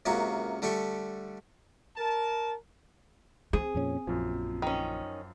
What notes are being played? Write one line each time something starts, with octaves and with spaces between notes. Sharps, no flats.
C#2 F#2 C3 A#3 F#4
D3 G3 A3 G4 C#6
A#4 A5
C4 G#4
F2 A#2 C#4
A#1 F#2 F3
D#3 C#4